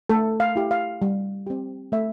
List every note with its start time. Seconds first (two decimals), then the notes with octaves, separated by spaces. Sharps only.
0.09 A3 A4
0.40 F5
0.56 E4 G4
0.71 F5
1.02 G3
1.47 C4 G4
1.92 A3 E5